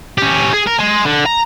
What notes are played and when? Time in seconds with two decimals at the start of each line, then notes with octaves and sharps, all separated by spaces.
0.18 C#4 G4
0.54 G#4
0.67 A#4
0.79 G#5 C6
1.05 D3
1.26 A#5